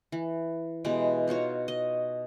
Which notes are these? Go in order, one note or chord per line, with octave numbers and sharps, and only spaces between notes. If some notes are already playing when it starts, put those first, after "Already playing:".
E3
B2 E3 G#3 G4
D#4 F4 F#4 C#5
D#5